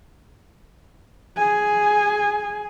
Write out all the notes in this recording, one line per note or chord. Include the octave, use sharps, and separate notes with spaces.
G#4 G#5